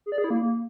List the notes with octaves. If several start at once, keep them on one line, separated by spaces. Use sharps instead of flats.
G#4
D5
G#4
E4
A#3